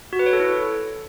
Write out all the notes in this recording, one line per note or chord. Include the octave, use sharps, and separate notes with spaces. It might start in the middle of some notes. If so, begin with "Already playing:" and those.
F#4
B4
C#5
A4
E4